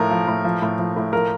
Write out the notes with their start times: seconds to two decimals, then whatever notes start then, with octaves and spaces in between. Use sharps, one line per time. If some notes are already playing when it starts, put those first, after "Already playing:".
Already playing: A2 F3 A#4
0.11 F3
0.27 A2
0.44 F3
0.62 A2
0.79 F3
0.96 A2
1.13 F3 A#4